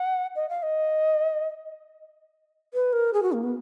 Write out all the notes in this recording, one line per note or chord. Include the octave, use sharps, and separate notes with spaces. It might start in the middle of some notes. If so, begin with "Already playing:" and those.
Already playing: F#5
D#5
F5
D#5
B4
A#4
G#4
F#4
A#3
B3